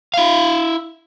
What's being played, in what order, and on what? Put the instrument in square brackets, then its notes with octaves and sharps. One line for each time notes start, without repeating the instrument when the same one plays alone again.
[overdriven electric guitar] E4 F5